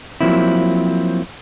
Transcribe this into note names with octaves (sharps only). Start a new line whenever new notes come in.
F3 F#3 A#3 C4 E4